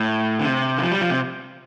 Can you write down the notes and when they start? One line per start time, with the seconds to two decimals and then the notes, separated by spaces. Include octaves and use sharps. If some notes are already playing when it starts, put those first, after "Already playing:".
Already playing: A2
0.39 D3
0.45 C3
0.78 D3
0.83 F3
0.92 G3
1.01 F3
1.10 C3